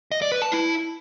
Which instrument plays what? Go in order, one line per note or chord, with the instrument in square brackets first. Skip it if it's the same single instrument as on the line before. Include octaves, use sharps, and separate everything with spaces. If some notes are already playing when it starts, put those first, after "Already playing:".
[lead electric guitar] D#5
D5
B4
A5
E4